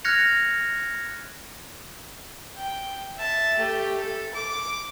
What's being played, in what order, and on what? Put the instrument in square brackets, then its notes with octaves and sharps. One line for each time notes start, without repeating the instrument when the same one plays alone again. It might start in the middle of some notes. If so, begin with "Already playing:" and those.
[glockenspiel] F6 F#6 G#6 A#6 C#7 F7
[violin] G5
E5 A5
A3 G4
A4
D6